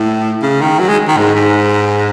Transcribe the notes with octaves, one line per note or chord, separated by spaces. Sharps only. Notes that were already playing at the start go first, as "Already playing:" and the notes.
Already playing: A2
C#3
D#3
F#3
G#3
D#3
G#2
G#2